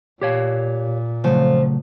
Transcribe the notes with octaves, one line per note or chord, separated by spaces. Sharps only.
A#2 G4 C#5 F5
F2 C#3 F3 F#3 A3